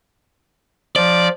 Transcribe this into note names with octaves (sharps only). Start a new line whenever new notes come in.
F3 D5